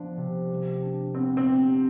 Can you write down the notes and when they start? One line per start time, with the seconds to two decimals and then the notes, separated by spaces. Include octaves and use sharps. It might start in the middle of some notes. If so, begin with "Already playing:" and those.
Already playing: F3 B3 D4
0.17 C3
0.50 G3
0.82 D4
1.15 B3 C4
1.37 C4
1.47 G4